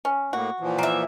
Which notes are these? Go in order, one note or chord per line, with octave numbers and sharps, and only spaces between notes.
C#4
A2 A#3 F#4
A#2 E3 F3
A#3 E5